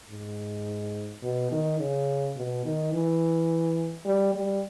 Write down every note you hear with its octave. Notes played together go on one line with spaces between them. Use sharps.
G#2
B2
D#3
C#3
B2
D#3
E3
G3
G3